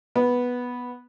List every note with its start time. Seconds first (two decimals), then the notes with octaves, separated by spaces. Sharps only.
0.16 B3